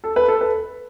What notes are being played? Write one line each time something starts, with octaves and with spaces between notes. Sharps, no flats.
A4
B4
A4
B4